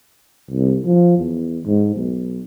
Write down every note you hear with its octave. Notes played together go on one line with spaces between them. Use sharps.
C2
F3
E2
G#2
B1